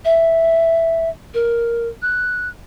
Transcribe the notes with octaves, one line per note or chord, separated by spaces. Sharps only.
E5
A#4
F#6